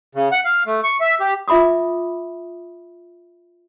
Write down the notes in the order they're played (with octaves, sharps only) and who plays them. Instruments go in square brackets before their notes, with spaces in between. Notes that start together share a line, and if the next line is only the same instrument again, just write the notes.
[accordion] C#3
F#5
F5
A3
C#6
E5
G4
[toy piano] F4 E5 B5 D6 D#6